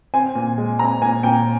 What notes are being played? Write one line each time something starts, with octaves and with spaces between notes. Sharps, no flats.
C4 G#5
A#2
G#3
C4 A#5
A#2 G#5
A#2 G5